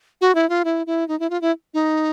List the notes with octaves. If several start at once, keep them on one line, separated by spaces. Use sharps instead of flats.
F#4
E4
F4
E4
E4
D#4
E4
F4
E4
D#4